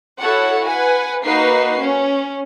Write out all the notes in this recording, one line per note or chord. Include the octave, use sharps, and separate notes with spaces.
E4 F#4 A4 C#5 F#5
B4 F#5 G#5
A#3 D#4 F#4 B4 C7
C#4